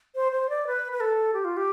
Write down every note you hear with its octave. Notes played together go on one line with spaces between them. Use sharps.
C5
C5
D5
B4
B4
A4
G4
F4
G4